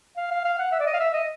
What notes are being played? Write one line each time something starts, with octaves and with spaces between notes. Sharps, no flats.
F5
F5
F5
F#5
E5
D5
D#5
F5
E5
D#5